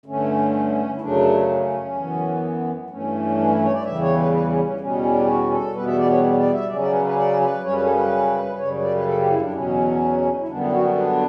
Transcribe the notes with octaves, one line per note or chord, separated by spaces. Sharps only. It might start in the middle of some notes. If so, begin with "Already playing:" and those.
G2 D3 A3 C#4
E4
F#2 C#3 F#3 A3 D4
C#4
F#2 E3 B3
G2 E3 A3 C#4
D4
E4
C#5
D5
E2 C#3 E3 G3 E5
C#5
B4
B4
C#4
C#4
E2 B2 G3 C#4
D4
G4
F#4
A4
E2 B2 G3 B3 B4
E5
D5
B4
C#5
D5
E5
C#3 F#3 C#4 D5
D5
B4
B4
D5
B4
F#2 C#3 G3 C#4 C#5
B4
A4
B4
F#2 C#3 G3 C#5
D5
B4
A4
G4
E4
D4
E2 B2 F#3 C#4
E4
F#2 D3 G3 B3 D4
E4
F#4
D4
D4